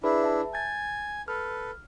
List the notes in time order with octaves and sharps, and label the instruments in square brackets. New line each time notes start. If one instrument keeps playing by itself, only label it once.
[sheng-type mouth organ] D4 E4 [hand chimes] G#4 B4 B5
[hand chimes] E5 A5
[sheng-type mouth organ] G#5 [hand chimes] G6 A6
[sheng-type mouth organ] A4 B4 [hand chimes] F6